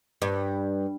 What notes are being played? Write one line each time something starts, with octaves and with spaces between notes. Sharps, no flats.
G2